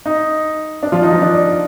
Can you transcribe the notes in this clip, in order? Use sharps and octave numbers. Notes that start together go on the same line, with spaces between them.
D#4
D4
F3 F4
D#4
F3 F4
D4